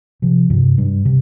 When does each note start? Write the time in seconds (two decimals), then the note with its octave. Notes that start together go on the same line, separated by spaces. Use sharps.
0.22 C3 F3
0.50 G2 C3
0.78 G2
1.05 C3